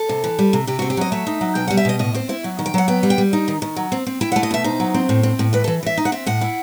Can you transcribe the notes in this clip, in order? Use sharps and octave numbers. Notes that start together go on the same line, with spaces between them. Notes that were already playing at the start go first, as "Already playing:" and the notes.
Already playing: A4
C3
E3
G3
C3
C3 G4
C4 F#4
G4
F#3 D#5
A3 E5
D#4
F#3
B2 G5
G3 F#5
E5
B2 D#5
A2 D#5
C4 C5
E4 E5
F#3
D#3
G5
F#3 F#5
B3 G5
G3
G5
G3
D#4
D#3
D#3
F#3
C4
C4
E4 G5
A3 F#5
D#5
B2 E5
D#4 C5
F#3
C4
A2
C4
A2
E3 B4
E3 A4
E3 E5
D#4
F#5
C4 E5
A2 F#5
E4